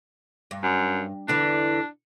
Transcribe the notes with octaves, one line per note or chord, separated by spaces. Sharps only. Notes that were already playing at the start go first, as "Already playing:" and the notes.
G2
F#2
E2 D3 E3 D4